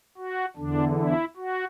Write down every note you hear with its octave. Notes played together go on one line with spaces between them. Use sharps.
F#4
E2 D3 D4
E4
F#4